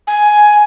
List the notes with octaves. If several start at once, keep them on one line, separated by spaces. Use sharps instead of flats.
G#5